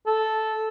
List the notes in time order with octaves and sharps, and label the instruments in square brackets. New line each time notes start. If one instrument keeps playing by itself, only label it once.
[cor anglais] A4